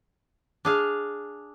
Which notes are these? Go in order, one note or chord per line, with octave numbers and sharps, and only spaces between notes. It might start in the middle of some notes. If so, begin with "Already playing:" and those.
D4 G#4 F5